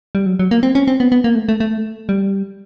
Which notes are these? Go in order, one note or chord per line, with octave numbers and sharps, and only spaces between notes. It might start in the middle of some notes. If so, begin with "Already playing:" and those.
G3
F#3
F#3
A#3
C4
C#4
C4
B3
B3
A#3
A3
A3
A3
G3